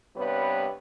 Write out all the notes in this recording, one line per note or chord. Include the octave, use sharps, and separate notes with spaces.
G2 C3 G3 B3 B4 C#5